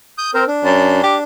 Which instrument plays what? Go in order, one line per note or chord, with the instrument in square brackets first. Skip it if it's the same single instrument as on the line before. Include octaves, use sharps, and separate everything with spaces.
[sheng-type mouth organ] D#6 G6
C4 A#4 C5
D4
[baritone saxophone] F#2
G4